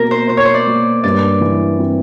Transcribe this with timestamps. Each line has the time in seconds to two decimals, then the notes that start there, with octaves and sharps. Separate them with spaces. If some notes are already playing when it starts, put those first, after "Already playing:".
Already playing: B2 A#3 A#4
0.11 C5
0.29 B2 C5
0.37 C#5
0.45 C5
0.54 D5
0.67 A#3
1.04 G2 D5
1.41 E3
1.78 C4